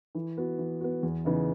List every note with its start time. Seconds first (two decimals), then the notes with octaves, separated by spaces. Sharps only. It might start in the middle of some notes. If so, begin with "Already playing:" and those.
0.15 E3
0.37 B3 F#4
0.58 E3
0.81 B3 F#4
1.03 E2
1.25 C#3 E3 B3 D#4